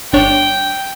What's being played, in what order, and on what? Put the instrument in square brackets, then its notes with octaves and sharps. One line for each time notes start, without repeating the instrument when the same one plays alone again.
[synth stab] G1 D4 C#5 [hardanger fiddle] G5